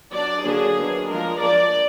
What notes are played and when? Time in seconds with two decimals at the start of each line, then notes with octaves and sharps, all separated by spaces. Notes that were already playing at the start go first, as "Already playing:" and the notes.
0.12 F#3 D4 D5
0.44 D3 F#3 A#3 D4 G#4
0.77 D#3 F#3 B3 D4
1.09 F3 G#3 D4 A#4
1.41 F3 A#3 D4 D5